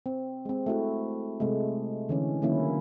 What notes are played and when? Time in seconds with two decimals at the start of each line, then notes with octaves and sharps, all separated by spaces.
0.06 C4
0.45 G#3 C4
0.66 A3 E4 F#4
1.40 C3 G#3 A3
2.09 D3 E3 C#4
2.42 D3 D#3 F#3 A#3 C#4 E4